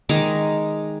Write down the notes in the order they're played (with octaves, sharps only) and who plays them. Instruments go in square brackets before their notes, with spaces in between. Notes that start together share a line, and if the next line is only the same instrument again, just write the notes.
[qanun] D#3 G#3 A#5 D6